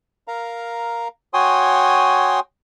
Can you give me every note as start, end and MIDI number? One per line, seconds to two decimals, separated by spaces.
0.28 1.08 70
0.28 1.08 77
0.28 1.08 82
1.34 2.40 66
1.34 2.40 73
1.34 2.40 79
1.34 2.40 80
1.34 2.40 84
1.34 2.40 87